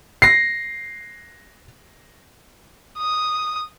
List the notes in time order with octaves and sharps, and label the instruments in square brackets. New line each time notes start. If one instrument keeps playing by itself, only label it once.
[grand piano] A#6 C7
[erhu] D#6